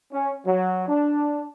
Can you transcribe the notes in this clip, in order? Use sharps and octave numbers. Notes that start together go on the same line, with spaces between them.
C#4
F#3
D4